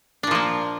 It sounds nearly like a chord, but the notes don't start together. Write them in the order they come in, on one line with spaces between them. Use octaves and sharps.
D4 A#2 F3 A#3